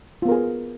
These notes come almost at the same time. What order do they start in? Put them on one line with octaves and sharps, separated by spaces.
F4 B3 A#4 G#4